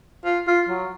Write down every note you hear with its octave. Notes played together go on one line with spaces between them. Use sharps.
F4
F4
F#3